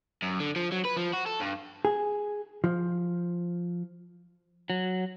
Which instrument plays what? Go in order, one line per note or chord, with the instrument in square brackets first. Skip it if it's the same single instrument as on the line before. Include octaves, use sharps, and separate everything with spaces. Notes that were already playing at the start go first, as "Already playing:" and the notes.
[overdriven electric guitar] F#2
D3
F3
F#3
B4
F3
F#4
A4
G2
[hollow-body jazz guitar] G#4
F3
[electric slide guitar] F#3